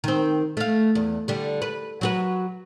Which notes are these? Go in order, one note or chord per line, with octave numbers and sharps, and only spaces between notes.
D#3 C4
A3 F5
E2
D3 G3
B4
F#3 F#4 B4